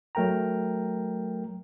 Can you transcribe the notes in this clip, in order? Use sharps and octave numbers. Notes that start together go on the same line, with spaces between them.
F#3 A3 A#4 G5 A#5